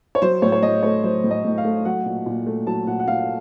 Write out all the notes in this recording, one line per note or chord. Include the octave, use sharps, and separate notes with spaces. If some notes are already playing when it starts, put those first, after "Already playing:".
C#5
F#3 C5
A2 C#5
C#5
A2 D#5
A3 C#5
F#3 C5
A2
D#5
A2
F5
A3
F#3 F#5
A#2
A#2
A3
F#3 A5
A#2 F#5
F#5
A#2 F5